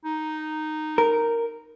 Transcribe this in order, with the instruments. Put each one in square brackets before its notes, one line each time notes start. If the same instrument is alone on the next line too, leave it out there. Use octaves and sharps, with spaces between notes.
[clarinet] D#4
[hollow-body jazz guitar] A#4